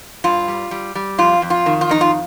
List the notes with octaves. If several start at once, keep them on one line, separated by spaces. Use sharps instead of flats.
G2 F4
G3
G3
G3
F2 F4
F2
F4
D#3
F4
F2 D#4
F4